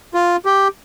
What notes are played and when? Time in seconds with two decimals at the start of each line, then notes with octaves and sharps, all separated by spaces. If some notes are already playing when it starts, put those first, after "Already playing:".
0.14 F4
0.45 G4